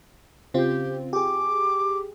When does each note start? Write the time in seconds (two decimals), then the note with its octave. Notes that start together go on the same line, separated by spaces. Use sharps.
0.54 C#3 C4 F4 G4
1.13 G4 G#4 D6